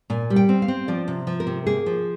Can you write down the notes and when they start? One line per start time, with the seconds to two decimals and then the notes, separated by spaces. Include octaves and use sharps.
0.10 A#2 G#5
0.30 G3
0.36 G5
0.49 C4
0.62 F5
0.68 C4
0.88 F3 D5
1.08 C3
1.27 F3
1.40 A#4
1.47 C3
1.67 A#3 G#4
1.86 F3